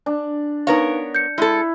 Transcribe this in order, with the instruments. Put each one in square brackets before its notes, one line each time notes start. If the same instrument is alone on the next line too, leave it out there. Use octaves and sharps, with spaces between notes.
[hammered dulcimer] D4
[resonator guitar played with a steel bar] B3 A#4 C#5 [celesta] D#4 B4 F5
[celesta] G6 C#7
[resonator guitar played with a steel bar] G#3 A4 [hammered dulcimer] E4